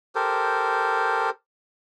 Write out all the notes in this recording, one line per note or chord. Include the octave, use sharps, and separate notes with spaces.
G4 A4 A#4 C5